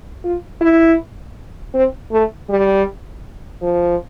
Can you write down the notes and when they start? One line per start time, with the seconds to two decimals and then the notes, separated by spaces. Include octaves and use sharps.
0.24 F4
0.61 E4
1.74 C4
2.12 A3
2.49 G3
3.62 F3